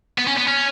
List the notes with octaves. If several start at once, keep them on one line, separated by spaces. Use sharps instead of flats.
B3
C#4
B3
C#4